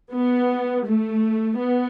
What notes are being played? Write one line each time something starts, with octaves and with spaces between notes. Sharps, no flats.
B3
A3
B3